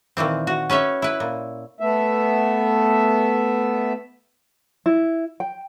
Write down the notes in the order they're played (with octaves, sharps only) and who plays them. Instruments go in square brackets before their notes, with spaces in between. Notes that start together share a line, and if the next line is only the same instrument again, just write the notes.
[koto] A#2 D#3 E3 C4
F#4
C#4 B4 C#5 E5
E4 B4
A#2
[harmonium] A3 B3 E5
[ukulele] E4
G5